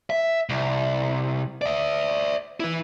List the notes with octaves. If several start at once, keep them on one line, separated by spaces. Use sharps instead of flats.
E5
C2
D5 E5
E4 B4